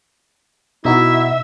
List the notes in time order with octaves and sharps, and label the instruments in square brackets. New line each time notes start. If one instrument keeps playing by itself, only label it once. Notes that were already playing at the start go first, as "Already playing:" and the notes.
[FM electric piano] B2 D#4 F#4 [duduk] E4 [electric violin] E5